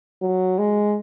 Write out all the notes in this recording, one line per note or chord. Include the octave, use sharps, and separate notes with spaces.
F#3
G#3